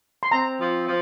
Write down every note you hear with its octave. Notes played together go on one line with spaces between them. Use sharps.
C6
C4 A#5
F3
F3